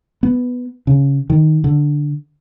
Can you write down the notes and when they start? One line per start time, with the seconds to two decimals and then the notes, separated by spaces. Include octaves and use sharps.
0.23 B3
0.87 C#3
1.30 D#3
1.64 D3